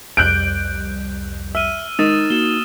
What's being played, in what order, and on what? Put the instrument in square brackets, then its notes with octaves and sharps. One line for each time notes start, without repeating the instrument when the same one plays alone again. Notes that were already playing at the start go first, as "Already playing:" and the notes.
[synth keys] C2 F2 G3 [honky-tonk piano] F#6 G6 D7
[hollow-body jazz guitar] E5 [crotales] E6 F6 D#7
[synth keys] G#3 [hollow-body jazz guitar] D#4 A#4 [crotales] D#6 A6 E7
[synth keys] A#3 F#4 [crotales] E7 G7